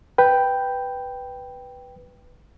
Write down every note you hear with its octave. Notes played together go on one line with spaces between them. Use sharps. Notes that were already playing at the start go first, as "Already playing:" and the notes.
B4 G5